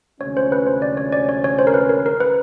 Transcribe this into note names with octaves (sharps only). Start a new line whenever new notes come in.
D2 C3 F3 G#3 C#4 C#5
C5
B4
C5
D5
C#5
D5
C#5
C#5
C5
A#4
B4
A#4
A#4
B4